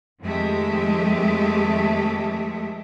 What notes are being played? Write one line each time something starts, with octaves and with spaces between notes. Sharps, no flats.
F2 D#3 G#3 A3 G4 E5